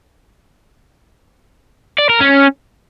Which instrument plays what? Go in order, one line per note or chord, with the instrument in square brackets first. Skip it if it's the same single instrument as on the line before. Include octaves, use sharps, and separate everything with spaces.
[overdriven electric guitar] D5
A#4
C#4